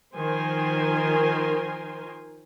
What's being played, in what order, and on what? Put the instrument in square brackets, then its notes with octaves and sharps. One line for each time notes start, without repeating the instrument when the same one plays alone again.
[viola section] D#3 F3 A#4 C5 G#5 C6